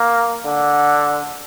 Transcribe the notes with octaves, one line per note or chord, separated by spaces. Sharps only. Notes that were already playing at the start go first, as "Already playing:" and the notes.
Already playing: A#3
D3